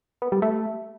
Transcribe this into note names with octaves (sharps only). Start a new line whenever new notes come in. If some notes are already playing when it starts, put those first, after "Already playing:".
B3
G3
A3